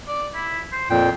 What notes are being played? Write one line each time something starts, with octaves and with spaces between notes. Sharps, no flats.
D5
E4
C5
F2 A#2 G5